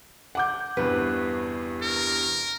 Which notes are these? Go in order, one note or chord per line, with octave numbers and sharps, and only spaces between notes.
F#5 D6 G6
E2 G2 C3 B4
A#4